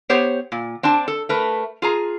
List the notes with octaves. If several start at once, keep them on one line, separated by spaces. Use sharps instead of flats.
B3 G4 C5 C#5
A#2
C4 D4 D5 A5
A4
A3 A#4 B4
F4 G#4 A#5